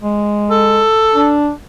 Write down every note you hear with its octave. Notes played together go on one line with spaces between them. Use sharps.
G#3
A4
D4